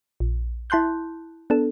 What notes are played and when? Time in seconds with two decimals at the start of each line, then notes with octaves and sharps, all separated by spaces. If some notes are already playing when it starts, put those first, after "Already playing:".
0.20 A#1
0.70 E4 A5 C6 F#6 G6
1.50 B3 D4 A4